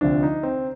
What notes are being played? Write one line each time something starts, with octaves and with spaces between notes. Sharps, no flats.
D2 C3 F3 D4
D#4
C4